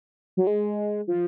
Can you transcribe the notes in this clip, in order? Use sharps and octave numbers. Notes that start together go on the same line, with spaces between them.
F#3
G#3
F3